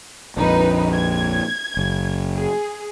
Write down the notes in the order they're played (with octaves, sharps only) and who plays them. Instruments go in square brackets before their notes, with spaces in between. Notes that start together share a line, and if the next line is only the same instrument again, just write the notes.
[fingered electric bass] A#1 F2 [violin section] D#4 B4
[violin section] G#6
[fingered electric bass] F#1
[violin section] G#4